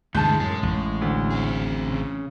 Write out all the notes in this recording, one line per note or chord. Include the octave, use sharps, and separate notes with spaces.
D2 G2 B2 E3 G#3 D#4 A5 G6
F#2 A2 G#3 G#4
A1 A2
D2
C4 G#4
C#3